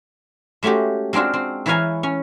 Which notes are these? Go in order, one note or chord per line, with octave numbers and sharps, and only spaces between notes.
G#3 A3 C#4 F#4 G4
G#3 C4 D4 F4 F#4
C4
E3 B4 C#5 F5 G#5 A#5
C#4